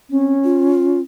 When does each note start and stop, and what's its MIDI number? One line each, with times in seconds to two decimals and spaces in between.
0.10 0.34 60
0.10 1.02 61
0.44 1.00 65